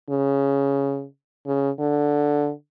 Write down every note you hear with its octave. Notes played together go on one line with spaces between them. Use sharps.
C#3
C#3
D3